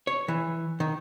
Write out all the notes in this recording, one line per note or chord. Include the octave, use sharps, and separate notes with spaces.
C#5
E3
D#3